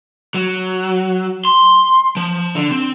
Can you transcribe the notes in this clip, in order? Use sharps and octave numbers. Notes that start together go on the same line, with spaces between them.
F#3
C6
F3
D3
C4